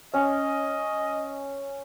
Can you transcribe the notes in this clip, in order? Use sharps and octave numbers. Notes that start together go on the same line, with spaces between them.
C#4 D#5